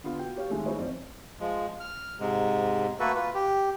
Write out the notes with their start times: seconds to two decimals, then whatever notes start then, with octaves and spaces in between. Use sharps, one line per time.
0.04 D3 B3 F4
0.19 F#4 G5
0.36 G4 C#5 F5
0.50 D#3 G#3 A3
0.65 G#3 D#4 E4 C5 C#5 D#5
0.78 F2 C4 D5
1.40 F3 G#3
1.80 F6
2.20 G#2 C3 G#3
3.00 A3 A#3 F#4 A4 B4
3.15 F4 B4
3.34 G4